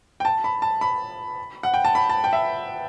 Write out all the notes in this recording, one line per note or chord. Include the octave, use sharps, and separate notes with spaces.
G5
A5
B5
A5
B5
F#5
G5
A5
B5
A5
G5
E5